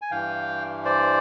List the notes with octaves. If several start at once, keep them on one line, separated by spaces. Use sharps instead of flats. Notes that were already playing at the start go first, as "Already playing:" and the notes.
G#5
G2 E3 F5 G5
C5 D5